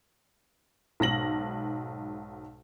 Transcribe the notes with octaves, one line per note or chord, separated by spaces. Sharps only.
B1 G#2 A#6 F#7